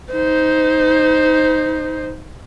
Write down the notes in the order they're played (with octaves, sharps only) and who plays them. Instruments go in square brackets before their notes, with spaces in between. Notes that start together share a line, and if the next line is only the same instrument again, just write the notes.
[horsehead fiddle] D#4 C5